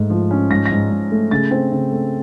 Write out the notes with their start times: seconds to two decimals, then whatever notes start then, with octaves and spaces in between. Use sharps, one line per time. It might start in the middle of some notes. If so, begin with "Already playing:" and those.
Already playing: G#2 A3
0.10 F3
0.31 C#4
0.51 G#2 A#6
0.66 A#6
0.71 G#2
0.91 G#2
1.11 A3
1.31 C#3 A6
1.51 C4
1.72 C#3
1.92 A3